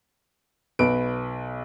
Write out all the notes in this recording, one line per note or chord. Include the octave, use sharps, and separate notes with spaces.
B1 B4 D7